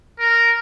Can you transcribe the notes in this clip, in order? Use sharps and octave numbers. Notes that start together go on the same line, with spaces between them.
A#4